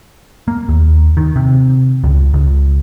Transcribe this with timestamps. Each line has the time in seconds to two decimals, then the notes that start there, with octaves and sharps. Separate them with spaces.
0.48 A#3
0.69 D#2
1.17 D#3
1.36 C3
2.04 C#2
2.34 C#2